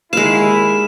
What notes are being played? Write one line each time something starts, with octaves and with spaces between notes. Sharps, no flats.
D#2 G#3 E4 F5 E7